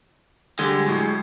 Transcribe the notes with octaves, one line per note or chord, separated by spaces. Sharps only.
D3 G3 G#3 G4
A2 F#3